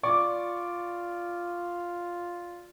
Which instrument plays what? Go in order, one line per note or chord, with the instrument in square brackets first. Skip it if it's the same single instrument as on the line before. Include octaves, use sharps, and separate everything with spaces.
[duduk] F4 [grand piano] D5 C#6 D6